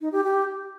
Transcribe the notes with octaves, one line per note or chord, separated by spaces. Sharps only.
D#4
G4
G4